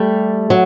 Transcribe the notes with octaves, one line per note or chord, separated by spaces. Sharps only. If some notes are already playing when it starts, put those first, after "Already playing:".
Already playing: G3 A3
F#3